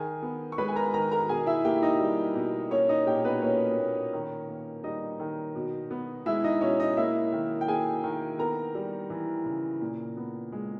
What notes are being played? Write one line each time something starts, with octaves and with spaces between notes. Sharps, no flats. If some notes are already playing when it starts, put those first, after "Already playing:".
Already playing: D#3 G#4 G#5
B3
C#6
G#3 B4 B5
G#5
A#4 A#5
D#3 A#4 A#5
A#4 A#5
B2 G#4 G#5
E4 E5
A#3 G4 G5
D#4 D#5
G3
B2
A#3 C#4 C#5
D#4 D#5
A#2 G4 G5
B3 B4
A#3 C#4 C#5
A#2
D#3
A#3
G3 D#4 D#5
D#3
B2
B3
G#3 E4 E5
D#4 D#5
B2 C#4 C#5
D#4 D#5
A#3 E4 E5
D#3
G5
A#3 G#4 G#5
D#3
B3 A#4 A#5
G3
E3
C#3
A#2
B3
G#3